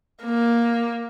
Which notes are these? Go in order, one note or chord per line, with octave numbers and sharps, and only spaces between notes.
A#3